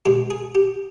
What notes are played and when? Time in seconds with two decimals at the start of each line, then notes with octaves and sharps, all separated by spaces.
0.05 B2 G#3 G4
0.30 G#4
0.55 G4